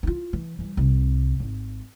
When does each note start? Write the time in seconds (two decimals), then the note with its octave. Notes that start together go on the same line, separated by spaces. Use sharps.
0.03 D#4 F4
0.33 E3
0.58 E3 G3
0.77 C2 C3
1.40 G#1